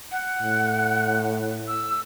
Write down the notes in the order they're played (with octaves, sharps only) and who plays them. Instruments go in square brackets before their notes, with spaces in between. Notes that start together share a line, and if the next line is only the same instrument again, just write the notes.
[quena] F#5
[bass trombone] A2
[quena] E6